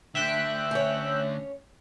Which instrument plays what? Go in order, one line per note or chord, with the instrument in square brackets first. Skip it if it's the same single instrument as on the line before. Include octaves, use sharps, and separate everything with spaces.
[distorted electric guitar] D2 D3 [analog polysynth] E5 G5 F#6
[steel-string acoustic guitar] C#4 C#5